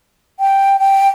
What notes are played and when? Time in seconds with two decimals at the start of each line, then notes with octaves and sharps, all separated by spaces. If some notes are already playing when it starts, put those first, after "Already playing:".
0.40 G5
0.79 G5